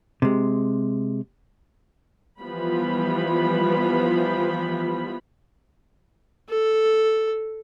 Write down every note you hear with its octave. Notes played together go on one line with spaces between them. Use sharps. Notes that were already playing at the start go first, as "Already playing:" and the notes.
C3 G#3
E3 F3 G3 B3 F4 B5
A4